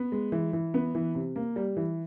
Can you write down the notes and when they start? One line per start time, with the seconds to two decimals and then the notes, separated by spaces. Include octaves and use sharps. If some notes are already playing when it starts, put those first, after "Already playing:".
Already playing: B3
0.12 G#3
0.32 E3
0.53 E3
0.74 B3
0.95 E3
1.15 C3
1.36 A#3
1.56 G3
1.77 E3